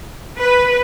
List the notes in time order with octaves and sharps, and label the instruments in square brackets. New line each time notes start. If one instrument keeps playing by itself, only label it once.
[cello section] B4